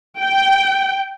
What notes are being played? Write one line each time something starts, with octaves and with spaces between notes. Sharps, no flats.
G5